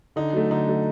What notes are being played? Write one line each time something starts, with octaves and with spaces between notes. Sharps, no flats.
D3 D#4
F#3 A3
D3 D#4
F#3 A3